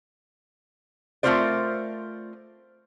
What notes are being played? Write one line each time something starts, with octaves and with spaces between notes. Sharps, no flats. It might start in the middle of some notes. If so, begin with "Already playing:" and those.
A3 C4 F4 A#4 C5 D5